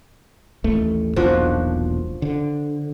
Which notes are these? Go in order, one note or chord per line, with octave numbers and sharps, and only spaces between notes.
A1 D#2 A3
E1 B1 A#2 F3 D4 F#4
D3